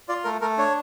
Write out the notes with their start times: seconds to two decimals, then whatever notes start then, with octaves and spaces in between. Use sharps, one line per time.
0.09 F4 D5
0.24 A3 A#4
0.41 A3 A#4
0.57 D4 C#5